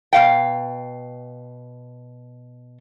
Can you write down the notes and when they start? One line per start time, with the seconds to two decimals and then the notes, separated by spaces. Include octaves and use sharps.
0.13 B2 F5 G5